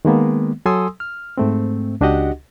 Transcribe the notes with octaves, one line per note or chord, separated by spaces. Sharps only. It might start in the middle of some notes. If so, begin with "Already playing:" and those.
D#3 G#3 A#3 B3
F#3 A4 G#5 C6 D#6 E6
F6
G#2 A3 C4
C#2 D4 F#4 G4 D#5 F#5